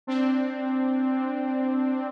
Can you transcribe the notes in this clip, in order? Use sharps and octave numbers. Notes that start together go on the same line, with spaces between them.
C4 D4